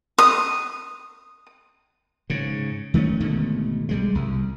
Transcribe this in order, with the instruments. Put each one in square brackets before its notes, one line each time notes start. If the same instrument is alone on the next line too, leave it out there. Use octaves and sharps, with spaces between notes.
[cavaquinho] D#6
[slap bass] G#2 C#3
D#3 A3 C4 C#4
G#1 B2 D3 A3
B1 G3 G#3
C2